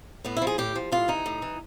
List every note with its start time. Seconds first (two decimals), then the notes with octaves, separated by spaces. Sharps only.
0.25 A2 B3
0.37 E4
0.42 F3
0.47 G#4
0.58 A2 G4
0.76 F3
0.92 A2 F4
1.08 E3 D#4
1.26 A2
1.42 E3